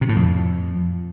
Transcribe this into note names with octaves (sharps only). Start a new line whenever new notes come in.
C3
A2
F2